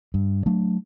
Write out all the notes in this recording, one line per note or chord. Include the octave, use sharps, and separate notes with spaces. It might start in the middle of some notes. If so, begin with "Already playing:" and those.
G2
F#3 A3 D4